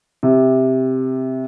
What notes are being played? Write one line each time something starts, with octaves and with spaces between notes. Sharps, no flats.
C3